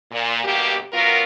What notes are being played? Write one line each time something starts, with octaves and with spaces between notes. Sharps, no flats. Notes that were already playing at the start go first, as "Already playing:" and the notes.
A#2
D2 G2 B2 A#3 G4
F#2 F#3 B3 F4 A#4